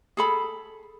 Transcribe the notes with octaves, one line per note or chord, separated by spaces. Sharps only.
G#4 A4 B5